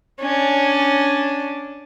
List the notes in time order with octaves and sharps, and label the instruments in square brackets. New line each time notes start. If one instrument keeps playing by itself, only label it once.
[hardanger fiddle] C#4 D4